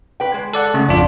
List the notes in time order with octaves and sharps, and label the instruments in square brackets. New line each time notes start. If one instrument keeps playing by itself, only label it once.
[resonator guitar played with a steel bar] B4 G5
G#3
[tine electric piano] A4 D5 F#5
C#3 A3
[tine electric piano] G#1 F2 F4 [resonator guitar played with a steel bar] D4